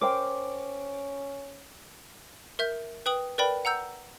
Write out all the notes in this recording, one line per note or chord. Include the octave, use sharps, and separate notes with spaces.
C#4 A#4 C5 G5 D6
A#4 E5 G6
B4 G5 D#6 F#7
A#4 B4 D5 G5 B5
F#5 A#5 E6 G6